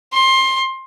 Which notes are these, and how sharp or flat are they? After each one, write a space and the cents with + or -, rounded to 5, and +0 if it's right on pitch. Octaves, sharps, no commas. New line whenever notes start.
C6 +20